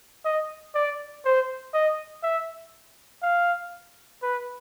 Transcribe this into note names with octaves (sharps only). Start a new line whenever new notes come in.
D#5
D5
C5
D#5
E5
F5
B4